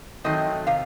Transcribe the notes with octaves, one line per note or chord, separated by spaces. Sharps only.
D#3 F#3 A3 C4 D#5
C3 F5